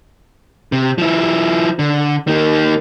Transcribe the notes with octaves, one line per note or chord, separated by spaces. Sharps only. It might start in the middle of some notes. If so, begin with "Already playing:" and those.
C3
F3 E4
D3
D#3 A#3